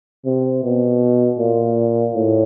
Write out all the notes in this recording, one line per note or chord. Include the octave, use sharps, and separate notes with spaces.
C3
B2
A#2
A2